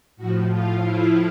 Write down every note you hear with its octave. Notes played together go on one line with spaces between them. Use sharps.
A2 F3 F#4
F4
E4